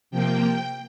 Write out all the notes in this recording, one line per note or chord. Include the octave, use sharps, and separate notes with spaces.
C3 F3 A#3 G5